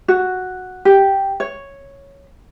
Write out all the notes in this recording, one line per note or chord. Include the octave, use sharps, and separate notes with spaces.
F#4
G4
C#5